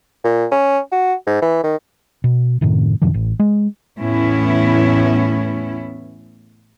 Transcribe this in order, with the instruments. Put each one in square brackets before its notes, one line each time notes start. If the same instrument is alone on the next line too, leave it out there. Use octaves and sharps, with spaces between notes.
[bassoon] A#2
C#4
F#4
G#2
E3
D#3
[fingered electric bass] B2
F#2 A2 C3 D#3
F#2 C3 D#3 F3
A1
G#3
[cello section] E2 A2 B3 C#4 E4